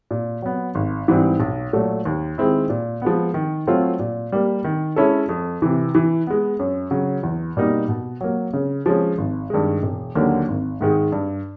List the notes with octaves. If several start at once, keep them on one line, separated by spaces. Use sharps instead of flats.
A#2
F#3 B3
G#1
G#2 E3 G3 C4
B1
A#2 F#3 A3
D#2
D#3 G#3 C4 E4
A#2
F3 G#3 B3
D#3
F#3 A3 C4 F4
A#2
G3 A#3
D#3
G#3 C#4 E4 A4
F2
C3 E3
E3
G#3 B3
F#2
C#3 F#3
E2
B2 G3 A#3 D#4
B2
F#3 A#3
C#3
F3 G#3 C#4
G#1
G2 D#3 G#3
E1
D#2 D3 F#3 A#3
G#1
G#2 D#3 G#3
G2